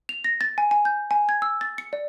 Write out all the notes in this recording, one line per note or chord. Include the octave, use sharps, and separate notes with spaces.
F7
A#6
A6
G#5
G#5
G6
G#5
G#6
E6
A6
C#7
D5